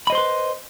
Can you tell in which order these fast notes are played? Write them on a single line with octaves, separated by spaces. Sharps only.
B5 D#5 C5 C6 B4